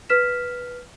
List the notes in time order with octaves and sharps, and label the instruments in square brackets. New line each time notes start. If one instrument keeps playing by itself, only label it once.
[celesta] B4 F6 B6 E7